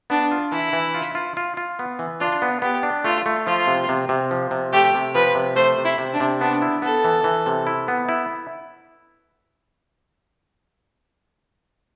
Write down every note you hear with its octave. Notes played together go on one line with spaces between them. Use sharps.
B3 D4
F4
E3 E4
E3
F4
F4
F4
F4
B3
E3
D4 F4
B3
B3 G4
D4
A3 F4
A3
F3 F4
C3
C3
C3
F3
C3
A3 G4
C3
F3 B4
C3
A3 C5
C3
E4
C3
D4
C3
B3 D4
E4
B3 A4
E3
E3
C3
E4
B3
E4